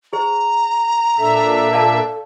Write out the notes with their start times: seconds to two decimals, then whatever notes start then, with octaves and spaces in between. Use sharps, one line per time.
0.13 G#4 C5 A#5
1.18 A#2 D4 A4 E5
1.73 D5 F5 A5